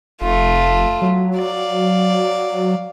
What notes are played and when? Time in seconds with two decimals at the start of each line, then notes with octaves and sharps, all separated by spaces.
0.21 F1 A3 F4
1.02 F#3
1.38 D5 F5